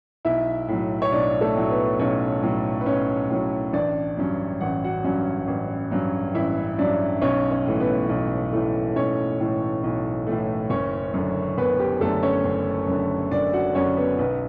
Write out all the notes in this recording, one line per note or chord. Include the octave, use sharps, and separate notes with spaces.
B1 E4 E5
A2 F#3
C#5
B1 D4 D5
A3 A4
A2 F#3
B3 B4
B1 C#4 C#5
A2 F#3
B4
B1 C#4 C#5
A2 F#3
A1 D4 D5
G2 F#3 C#4
A1 F#5
F#4 F#5
G2 F#3 C#4
A1
G2 F#3 C#4
A1 E4 E5
G2 F#3 C#4 D4 D5
B1 C#4 C#5
C#4 C#5
A2 E3 A3
B3 B4
B1
A2 E3 A3
B1 C#4 C#5
A2 E3 A3
B1
A2 E3 A3
F#1 C#4 C#5
F#2 D3
F#1 B3 B4
G4
F#2 D3 A3 A4
C#4 C#5
F#1
F#2 D3
F#1 D4 D5
F#4 F#5
F#2 D3 C#4 C#5
B3 B4
B1 B3 B4